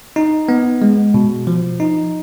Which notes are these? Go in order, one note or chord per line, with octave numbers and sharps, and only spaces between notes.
D#4
B3
G#3
B2
F3
D#4